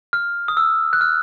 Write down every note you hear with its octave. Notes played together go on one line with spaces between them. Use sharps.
F6
D#6
E6
F#6
F6